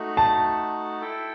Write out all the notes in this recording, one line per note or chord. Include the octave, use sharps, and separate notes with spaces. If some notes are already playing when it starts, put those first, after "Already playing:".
Already playing: A3 D#4 F#4
A5
E4 A4 E5 G5